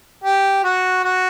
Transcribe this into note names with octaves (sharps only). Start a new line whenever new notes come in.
G4
F#4
F#4